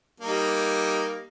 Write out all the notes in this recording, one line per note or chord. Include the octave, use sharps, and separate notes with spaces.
G3 A#3 D#4